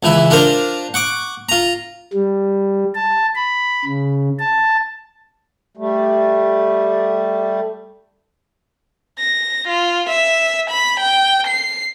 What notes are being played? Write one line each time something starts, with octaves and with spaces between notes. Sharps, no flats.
C#2 E3 E4
D4 F4 A#4 C5
F#5 C#6 D6
F4 A#5
G3
A5
B5
C#3
A5
G3 A3
A#6
F4
E5
B5
G5
C7